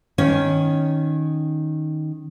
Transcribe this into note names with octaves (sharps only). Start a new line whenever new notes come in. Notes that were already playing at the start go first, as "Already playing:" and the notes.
D#3 C#4 C#5